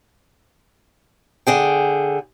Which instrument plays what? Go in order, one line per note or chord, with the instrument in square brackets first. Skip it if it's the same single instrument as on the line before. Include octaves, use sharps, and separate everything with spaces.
[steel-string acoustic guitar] D3 G#4 G5